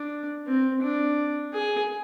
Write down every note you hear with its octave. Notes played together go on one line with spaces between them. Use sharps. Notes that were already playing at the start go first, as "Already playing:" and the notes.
Already playing: D4
C4
D4
G#4